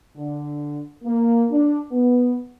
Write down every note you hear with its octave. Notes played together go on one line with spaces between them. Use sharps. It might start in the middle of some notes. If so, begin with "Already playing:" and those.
D3
A#3
D4
B3